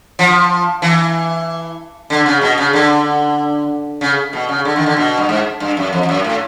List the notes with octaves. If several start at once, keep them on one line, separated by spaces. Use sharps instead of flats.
F3
E3
D3
C#3
B2
C#3
D3
C#3
B2
C#3
D3
D#3
D3
B2
G2
G#2
G2
F#2
F2
F2
F#2
A2